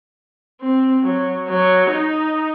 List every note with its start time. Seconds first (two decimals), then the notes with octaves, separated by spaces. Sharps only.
0.61 C4
1.03 F#3
1.49 F#3
1.91 D#4